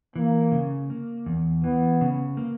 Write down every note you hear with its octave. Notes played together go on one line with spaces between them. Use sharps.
E3 A#3
C#3
A#3
E2
E3 B3
C#3
A#3